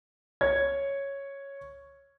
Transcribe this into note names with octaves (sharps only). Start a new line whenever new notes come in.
C#5 G#6